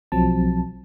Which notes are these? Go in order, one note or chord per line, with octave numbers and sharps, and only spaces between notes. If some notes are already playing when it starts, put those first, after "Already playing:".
B1 F3 F#3 C4 A5